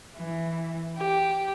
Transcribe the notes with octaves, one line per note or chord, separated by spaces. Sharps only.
E3
G4